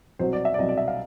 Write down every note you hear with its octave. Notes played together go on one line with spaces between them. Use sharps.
C2 B2 F#3 C5
D5
E5
D5
C2 B2 F#3 D#5
D5
E5
F5